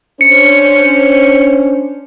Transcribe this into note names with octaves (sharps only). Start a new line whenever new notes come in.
C#4 D4 C5 C#7